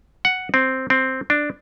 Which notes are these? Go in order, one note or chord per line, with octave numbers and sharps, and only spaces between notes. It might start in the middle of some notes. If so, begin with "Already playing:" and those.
F#5
C4
C4
D4